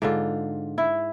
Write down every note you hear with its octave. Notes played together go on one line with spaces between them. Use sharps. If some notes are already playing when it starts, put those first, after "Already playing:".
G#2 D3 F4
E4